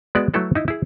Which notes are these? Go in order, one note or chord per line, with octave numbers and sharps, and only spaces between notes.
G#3 B3 F#4 D5 E5
F#3 A3 E4 A4 B4
D#4 E4
E4 G#4